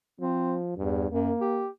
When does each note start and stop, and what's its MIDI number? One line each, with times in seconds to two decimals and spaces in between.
0.20 0.73 53
0.20 0.56 60
0.77 1.06 40
0.77 1.07 43
1.12 1.31 42
1.12 1.67 58
1.41 1.68 67